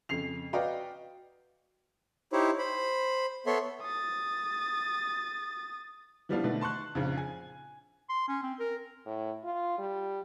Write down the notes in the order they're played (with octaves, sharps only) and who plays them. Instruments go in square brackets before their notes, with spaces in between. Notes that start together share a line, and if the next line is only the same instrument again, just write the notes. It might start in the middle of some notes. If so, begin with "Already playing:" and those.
[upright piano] F2 C#3 C7 F7
F#4 B4 D5 D#5 F5 G5
[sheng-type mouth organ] D#4 E4 G4 C5 C#5
C5 B5
B3 A4 C#5 E5 C6
[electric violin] D#6 A6
[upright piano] E3 F3 G3 B3 D4 F4
B2 D3 D#3 A3
A5 C6 C#6 F#6
A#1 F2 C#3
G#5
[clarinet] C6
C#4
C4
A#4
[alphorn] A2
F4
G3